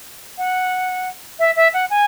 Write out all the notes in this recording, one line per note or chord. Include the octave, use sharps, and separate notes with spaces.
F#5
E5
E5
F#5
G#5